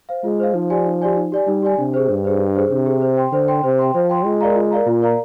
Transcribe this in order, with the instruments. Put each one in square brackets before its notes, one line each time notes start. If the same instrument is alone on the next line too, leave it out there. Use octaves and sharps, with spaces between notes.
[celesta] C5 F5
[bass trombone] G#3 [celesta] F4
[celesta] C5 F5
[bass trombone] F3 [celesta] D#4
[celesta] G4 D5 G#5
D#4
G4 D5 G#5
D#4
G4 D5 G#5
[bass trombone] G3 [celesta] D#4
[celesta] G4 D5 G#5
[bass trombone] C3 [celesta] D4
[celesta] G#4 C5
[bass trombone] G2 [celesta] D4
[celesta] G#4 C5
D4
G#4 C5
[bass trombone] C3 [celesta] D4
[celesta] G#4 C5
C5
G5 C6
[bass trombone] D3 [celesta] C5
[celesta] G5 C6
[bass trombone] C3 [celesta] C5
[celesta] G5 C6
[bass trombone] F3 [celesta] C5
[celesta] G5 C6
[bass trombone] G#3 [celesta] F4
[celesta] A#4 D5 F5 A#5
F4
A#4 D5 F5 A#5
[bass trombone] A#2 [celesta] F4
[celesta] A#4 D5 F5 A#5